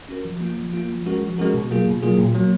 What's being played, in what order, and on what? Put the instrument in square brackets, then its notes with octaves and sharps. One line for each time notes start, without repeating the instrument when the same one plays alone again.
[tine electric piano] C#4 F#4 A#4
F3
A#3 F4
F3
A#3 F4
F3
G#3 C#4 F#4 A#4
F3
G#3 C#4 F#4 A#4
B2
F#3 A#3 F4 G#4
B2
F#3 A#3 F4 G#4
A#2
F#3 A#3